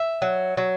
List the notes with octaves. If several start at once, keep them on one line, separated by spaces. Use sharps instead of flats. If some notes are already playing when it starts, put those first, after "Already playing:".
Already playing: E5
F#3
F#3